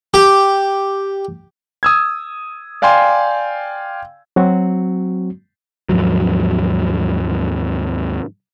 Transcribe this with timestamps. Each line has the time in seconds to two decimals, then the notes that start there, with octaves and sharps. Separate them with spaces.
0.14 G4
1.83 D#6 E6 G#6
2.82 D5 F5 G5 G#5 C6
4.36 F#3 C4 F#4
5.89 D#2 G#2 F3 F#3